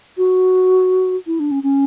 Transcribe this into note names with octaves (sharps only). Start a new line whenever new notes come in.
F#4
E4
D4
C#4
C#4